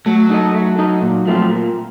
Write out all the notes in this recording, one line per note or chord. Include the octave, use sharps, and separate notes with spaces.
F#3 A3
D#4 A4 D#5
A3
D#4 A4 D#5
A#2
F3 A3 C4 F4
A#2